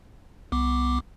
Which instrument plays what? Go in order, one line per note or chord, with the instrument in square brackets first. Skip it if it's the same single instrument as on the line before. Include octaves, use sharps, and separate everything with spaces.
[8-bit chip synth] C2 B3 D6